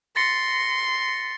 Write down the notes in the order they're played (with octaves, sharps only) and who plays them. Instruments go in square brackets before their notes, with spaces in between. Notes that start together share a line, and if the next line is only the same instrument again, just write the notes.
[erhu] C6 [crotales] A6 A#6 C#7